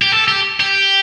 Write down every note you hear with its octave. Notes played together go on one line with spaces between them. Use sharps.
G4
A4
G4
G4